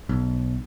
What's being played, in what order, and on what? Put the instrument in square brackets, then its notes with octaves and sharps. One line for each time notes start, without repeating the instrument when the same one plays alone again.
[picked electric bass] B1